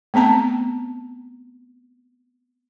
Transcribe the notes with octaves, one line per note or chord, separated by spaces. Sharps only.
A3 B3 C4 A5 A#5